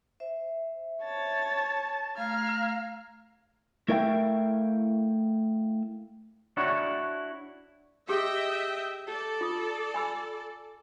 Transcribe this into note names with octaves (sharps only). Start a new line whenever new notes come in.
C5 E5
C#5 A5 A6
A3 F5 A#5 F6 G#6
A3 E4 A#4 E5 F5 G5
D4 E4 F#4 C#5
G4 G#4 D#5 E5 G5
A4 D5
F4 D6 D#6
G#5 B5 E6